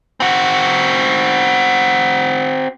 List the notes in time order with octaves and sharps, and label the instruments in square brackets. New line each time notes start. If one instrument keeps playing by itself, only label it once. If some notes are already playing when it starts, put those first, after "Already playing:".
[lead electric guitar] C4 F#4